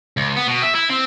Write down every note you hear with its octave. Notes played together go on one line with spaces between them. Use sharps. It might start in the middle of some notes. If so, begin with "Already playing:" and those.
C#2
B3
B2
E5
E4
C4